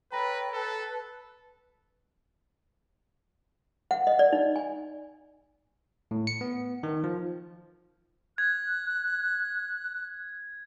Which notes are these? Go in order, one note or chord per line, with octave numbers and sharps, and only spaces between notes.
A4 B4 C#5 G5 A#5 B5 A#6
A4 B4 A5
F#5
D#5
D5
D#4
G#5
A2
C#7
B3
D#3
F3
F#6 G#6